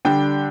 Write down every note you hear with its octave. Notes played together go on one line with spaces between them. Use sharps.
D3 G3 D4 G5